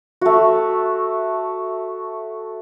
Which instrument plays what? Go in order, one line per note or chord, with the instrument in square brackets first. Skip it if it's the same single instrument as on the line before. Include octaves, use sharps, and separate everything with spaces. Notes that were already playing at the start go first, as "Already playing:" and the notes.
[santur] A3 F#4